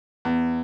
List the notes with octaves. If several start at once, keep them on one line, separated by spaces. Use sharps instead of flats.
E2